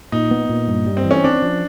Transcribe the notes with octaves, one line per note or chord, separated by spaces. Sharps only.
A#2 D#4
B3
A#2
G2
G3
C4
E3
C#4
C4 D4
F3